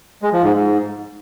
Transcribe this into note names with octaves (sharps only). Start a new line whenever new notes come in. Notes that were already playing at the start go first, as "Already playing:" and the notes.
G#3
F3
G#2
G#2